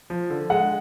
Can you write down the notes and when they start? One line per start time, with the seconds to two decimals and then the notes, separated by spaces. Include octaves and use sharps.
0.10 F3
0.30 D3
0.50 G#3 F#5